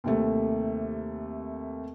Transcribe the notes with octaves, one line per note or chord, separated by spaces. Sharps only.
D#2 C3 A3